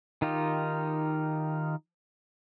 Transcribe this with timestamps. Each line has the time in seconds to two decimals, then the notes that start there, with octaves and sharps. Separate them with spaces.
0.22 D#3 D#4 F4 G4